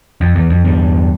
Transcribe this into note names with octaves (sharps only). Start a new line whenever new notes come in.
F2
E2
F2
E2 G2